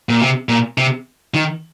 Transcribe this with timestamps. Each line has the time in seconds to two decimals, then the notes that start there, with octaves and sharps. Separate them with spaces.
0.09 A#2
0.21 C3
0.49 A#2
0.78 C3
1.34 D#3